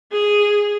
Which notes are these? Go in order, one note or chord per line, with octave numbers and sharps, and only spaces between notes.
G#4